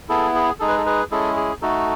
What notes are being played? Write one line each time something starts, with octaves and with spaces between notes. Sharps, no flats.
B3 E4 G#4 A4
G#4
G#3 D#4 G#4 A4
B4
A4
G#4 B4
G#3 C#4 E4 G#4 A4
G#4
A3 D#4 F#4 A4